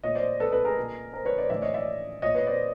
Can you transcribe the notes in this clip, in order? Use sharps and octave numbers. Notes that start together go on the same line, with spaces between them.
A#2 C#5 D#5
C5 D5
A4 B4
A4 B4
G#4 A#4
A#2
A#4 C5
B4 C#5
C5 D5
A2 E3 D5 E5
C#5 D#5
D5 E5
A#2 C#5 D#5
B4 C#5
C5 D5